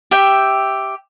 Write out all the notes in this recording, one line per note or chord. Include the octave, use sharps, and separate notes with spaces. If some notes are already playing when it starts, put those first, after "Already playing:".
G4 E5 G5